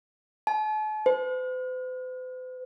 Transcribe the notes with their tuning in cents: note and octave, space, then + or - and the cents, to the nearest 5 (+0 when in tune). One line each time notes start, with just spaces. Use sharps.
A5 -45
C5 -45